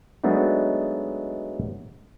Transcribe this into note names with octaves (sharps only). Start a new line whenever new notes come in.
F#3 G#3 A3 B3 D4 D#4